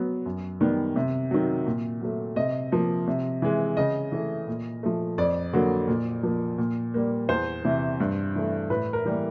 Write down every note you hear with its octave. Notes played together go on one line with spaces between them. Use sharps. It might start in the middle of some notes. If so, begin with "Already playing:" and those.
Already playing: F#3 B3
F#2
D#3 G3 B3
C3
D#3 F#3
A#2
F#3 A3
C3 D#5
F3 A#3
C3
E3 G#3
C#3 D#5
E3 A3
A#2
F3 A3
F2 D5
D3 F#3 A#3
A#2
F3 A#3
A#2
G3 A#3
E2 C5
C3 E3
G2
E3 A3
A2 B4
A#4
E3 G3 A#3